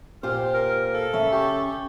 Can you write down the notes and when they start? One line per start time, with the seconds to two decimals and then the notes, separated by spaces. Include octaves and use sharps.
0.23 A#2 F4 G4 C5 F6
0.54 A#4
0.94 A4 F5
1.13 C#3 C#4 E5 A5
1.32 G4 C#6